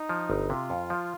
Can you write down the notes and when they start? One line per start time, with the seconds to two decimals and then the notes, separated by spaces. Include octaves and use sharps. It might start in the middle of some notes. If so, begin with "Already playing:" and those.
Already playing: D#4
0.09 F3
0.30 G1
0.50 C3 F4
0.70 F2
0.90 F3